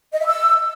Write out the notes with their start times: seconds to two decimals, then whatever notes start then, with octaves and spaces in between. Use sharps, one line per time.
0.13 D#5
0.19 E5
0.26 E6